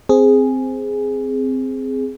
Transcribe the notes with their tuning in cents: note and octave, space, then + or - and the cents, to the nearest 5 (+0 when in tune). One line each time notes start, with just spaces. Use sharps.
C4 -5 G#4 +0